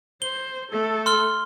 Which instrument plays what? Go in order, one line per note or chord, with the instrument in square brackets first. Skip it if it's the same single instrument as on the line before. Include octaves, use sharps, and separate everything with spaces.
[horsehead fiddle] C5 [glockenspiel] G7
[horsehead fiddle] A3 A4
[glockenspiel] C6 F6 G7